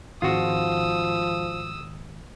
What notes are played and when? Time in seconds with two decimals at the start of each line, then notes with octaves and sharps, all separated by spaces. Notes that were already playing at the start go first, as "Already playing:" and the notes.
0.22 G#1 F3 F4 F#4 D#6 E6